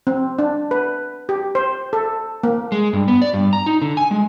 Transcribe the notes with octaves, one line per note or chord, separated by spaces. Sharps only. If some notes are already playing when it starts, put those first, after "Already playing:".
C4
D4
B4
G4
C5
A4
A#3
G#3
G2
B3
D5
G2
A#5
D#4
D3
G#5
G#3